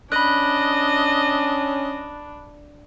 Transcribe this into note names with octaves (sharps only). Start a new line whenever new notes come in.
C#4 D4 D#5 B5 F#6